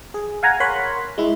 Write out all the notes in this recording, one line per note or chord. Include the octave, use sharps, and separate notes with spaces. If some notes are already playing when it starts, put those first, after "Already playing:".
G#4
F5 F#5 G#5 A#5
A#4 C#5 F#5 B5 C6
G#3 E4